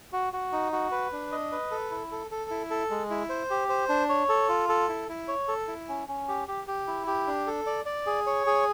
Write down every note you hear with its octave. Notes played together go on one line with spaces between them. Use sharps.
F#4
F#4
D#4
F#4
B4
D4
D#5
B4
A4
E4
A4
A4
E4
A4
G#3
E4
C5
G4
C5
D4
C#5
A4
F4
A4
E4
E4
C#5
A4
E4
C#4
C#4
G4
G4
G4
E4
G4
D4
A4
D5
D5
G#4
C#5
G#4